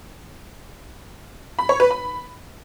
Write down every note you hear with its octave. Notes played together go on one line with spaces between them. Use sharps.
B5
C#5
B4
B5